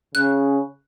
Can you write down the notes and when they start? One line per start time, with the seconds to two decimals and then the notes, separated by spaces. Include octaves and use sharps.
0.15 C#3 F#6